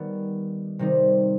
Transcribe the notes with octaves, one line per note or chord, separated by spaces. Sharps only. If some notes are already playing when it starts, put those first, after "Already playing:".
Already playing: D#3 G3 B3
C3 D#3 G3 C4 D#4